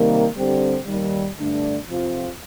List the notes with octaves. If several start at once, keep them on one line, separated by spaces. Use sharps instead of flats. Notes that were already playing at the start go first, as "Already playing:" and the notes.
Already playing: C3 D#3 G3 A#3
D3 G3 C4 G4
D#2 D#3 G3
G2 D3 A3 D4
F2 C3 F3 C4 F4